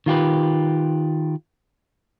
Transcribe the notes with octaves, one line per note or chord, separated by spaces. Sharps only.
D#3 F4 G4 B4